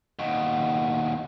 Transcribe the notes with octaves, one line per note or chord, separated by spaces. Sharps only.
D#2 B2